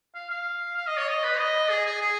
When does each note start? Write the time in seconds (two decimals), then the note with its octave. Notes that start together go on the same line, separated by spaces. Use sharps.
0.15 F5
0.30 F5
0.77 F5
0.87 D#5
0.97 C#5
1.08 D#5
1.23 B4
1.38 D#5
1.70 G#4
1.86 G#4
2.02 G#4